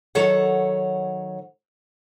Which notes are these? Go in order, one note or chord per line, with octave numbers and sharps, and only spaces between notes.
D#3 F#3 A4 C#5 F#5